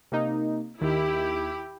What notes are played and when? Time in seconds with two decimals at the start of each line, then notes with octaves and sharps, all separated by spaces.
0.12 C3 A#3 D#4
0.81 D#2 D#3 E4 G4